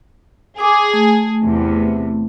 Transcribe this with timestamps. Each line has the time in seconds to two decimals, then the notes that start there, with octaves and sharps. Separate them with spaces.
0.59 G#4 D6 D#6
0.93 A3
1.44 E2 C3